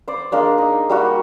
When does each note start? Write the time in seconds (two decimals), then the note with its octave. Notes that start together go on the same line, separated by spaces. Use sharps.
0.08 C5 D5
0.32 G#3 A#3 D4 D5
0.58 D#4
0.90 G3 A#3 F#4